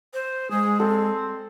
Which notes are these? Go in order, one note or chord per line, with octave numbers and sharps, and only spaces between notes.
C5
G#3 G#4
C4 A4